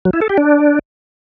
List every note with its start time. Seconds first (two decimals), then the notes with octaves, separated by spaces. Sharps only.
0.05 F#3
0.13 E4
0.21 A4
0.29 G4
0.37 D4